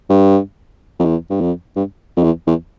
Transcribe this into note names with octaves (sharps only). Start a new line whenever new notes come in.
G2
F2
E2
G2
F2
G2
F2
E2
E2